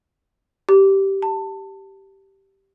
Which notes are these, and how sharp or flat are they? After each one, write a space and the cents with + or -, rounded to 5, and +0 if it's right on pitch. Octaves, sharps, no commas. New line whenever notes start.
G4 -10
A5 +20